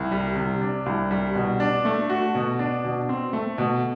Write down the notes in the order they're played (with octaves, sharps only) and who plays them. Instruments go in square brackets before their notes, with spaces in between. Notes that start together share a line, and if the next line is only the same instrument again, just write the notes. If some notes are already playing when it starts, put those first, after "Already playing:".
Already playing: [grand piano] C2
G3
C3
D4
C2
G3
B2
D4
A3
F#4
B2
D4
B2
C4
A3
B2